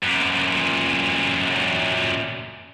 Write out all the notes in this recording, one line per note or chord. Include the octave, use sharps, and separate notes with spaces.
F#2 A#2